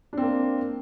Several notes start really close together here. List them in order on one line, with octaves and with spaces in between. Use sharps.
D4 C4 A#3